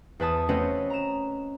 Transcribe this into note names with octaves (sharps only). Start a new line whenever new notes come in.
E2 B4 A5 D#6
A3 C4 C#4 F#4 B4 D#5
A#5 E7